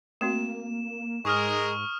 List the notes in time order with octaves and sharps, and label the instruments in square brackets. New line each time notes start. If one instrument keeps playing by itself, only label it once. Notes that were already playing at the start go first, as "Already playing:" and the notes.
[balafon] A3 C4 F#4 [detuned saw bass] A#3 [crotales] E7
[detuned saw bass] G#2 [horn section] G#3 G#4 A#4 [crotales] C#6 D#6 F6